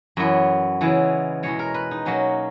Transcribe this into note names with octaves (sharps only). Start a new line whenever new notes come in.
F#2 E3 B3
C#3 E3 G#3 B3
E2 B2 G#3 C#5
A#4
B4
D#4
B2 F#3 A#3 C#4